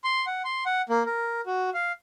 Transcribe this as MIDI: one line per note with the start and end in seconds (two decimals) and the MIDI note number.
0.04 0.26 84
0.27 0.42 78
0.45 0.64 84
0.66 0.82 78
0.89 1.03 58
1.06 1.41 70
1.46 1.70 66
1.74 1.92 77